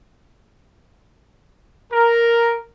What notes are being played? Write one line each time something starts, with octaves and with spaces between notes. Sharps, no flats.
A#4